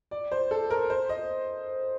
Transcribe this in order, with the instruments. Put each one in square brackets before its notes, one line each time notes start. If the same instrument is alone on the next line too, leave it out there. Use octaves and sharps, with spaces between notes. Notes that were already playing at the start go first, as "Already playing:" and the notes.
[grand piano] D5
C5
A4
A#4
C5
D#5